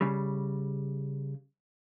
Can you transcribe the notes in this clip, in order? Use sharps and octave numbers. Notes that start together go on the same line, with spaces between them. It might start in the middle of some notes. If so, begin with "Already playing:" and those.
C#3 G3